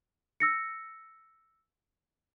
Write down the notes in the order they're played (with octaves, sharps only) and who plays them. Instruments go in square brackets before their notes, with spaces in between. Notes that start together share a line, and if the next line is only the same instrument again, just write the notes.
[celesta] E6 A#6 C#7